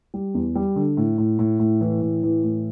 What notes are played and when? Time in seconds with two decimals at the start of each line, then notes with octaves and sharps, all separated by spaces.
0.14 G3
0.35 E2
0.55 G3
0.76 D3
0.97 A2
1.18 A2
1.39 A2
1.60 A2
1.81 E3
2.02 A2
2.23 E3
2.44 A2